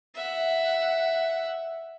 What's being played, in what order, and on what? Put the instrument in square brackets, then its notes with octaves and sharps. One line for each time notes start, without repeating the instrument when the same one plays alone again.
[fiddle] E5 F#5